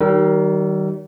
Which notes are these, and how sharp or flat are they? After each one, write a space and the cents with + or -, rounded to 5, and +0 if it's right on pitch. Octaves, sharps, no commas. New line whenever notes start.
D#3 +0 G3 -40 A#4 +0